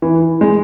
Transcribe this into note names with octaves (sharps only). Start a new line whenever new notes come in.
E3
G#3